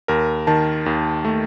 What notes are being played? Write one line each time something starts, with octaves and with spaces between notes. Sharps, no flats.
D#2 A#4
D#3 A5
D#2
A3